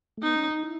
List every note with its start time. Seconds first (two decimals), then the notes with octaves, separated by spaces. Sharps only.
0.17 A3
0.23 B3 D#4
0.36 C#4
0.50 D#4
0.63 E4